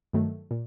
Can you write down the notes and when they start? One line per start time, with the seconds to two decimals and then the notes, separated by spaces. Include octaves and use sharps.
0.13 G2 D#3 F#3 A3
0.51 A#2